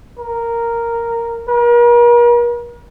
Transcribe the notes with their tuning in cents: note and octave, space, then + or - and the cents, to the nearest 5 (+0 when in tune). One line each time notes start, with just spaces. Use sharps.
A#4 -5
A#4 +40